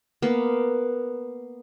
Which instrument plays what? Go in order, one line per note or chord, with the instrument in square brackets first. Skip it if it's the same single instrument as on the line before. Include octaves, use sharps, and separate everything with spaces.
[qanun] A#3 B3